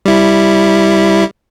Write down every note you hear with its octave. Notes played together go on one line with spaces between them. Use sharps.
G3 E4